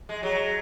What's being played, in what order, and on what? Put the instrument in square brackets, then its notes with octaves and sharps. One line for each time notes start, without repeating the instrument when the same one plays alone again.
[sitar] G#3
F#3